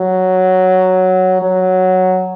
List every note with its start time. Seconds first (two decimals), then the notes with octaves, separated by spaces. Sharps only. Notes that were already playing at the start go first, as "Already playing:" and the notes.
Already playing: F#3
1.42 F#3